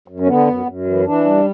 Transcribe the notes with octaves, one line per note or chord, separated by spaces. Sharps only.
F#2
C#4
D3 B3
F#2
F#2
E3
E3 D4
G3